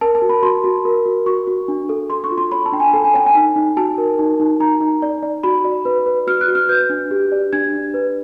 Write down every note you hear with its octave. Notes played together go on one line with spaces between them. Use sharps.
A#4 A5
A5
F#4
B5
F#4 C6
F#4
A#4
F#4
F#4 C#6
F#4
D4
A4
A4 C6
C#6
F4
C6
C#5 B5
A5
D4 G5
G#5
A4 A5
G#5
C#5 G5
G#5
D#4
D#4
F#4 A5
A#4
D#4
D#4
D#4 A#5
D#4
D5
D5
F#4 B5
D5
B4
B4
F#4 F6
F#6
F#4
F6
B4 G6
D4
G4
D5
D4 G#6
D4
B4